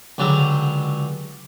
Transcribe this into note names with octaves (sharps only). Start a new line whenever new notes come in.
C#2 D3 F#3 G4 A#5